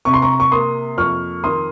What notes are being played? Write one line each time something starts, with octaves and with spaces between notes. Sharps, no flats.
C3 C#6
C6
A#5 C#6
C#6
A#3 C6 D#6
F2 C#6 F6
D#3 C6 D#6